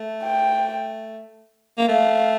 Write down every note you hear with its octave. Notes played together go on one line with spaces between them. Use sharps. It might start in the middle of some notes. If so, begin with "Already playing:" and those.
Already playing: A3
G5
A#3
A3 F5